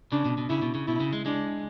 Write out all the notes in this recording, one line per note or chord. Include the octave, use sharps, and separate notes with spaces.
C#3 D4
B2
B2
C#3 E4
B2
C#3
B2 E4
C#3
G#3
G#3 D4